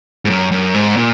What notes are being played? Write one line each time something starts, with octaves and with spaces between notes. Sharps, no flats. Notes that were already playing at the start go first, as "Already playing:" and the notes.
G#2
F#2
F#2
G#2
A#2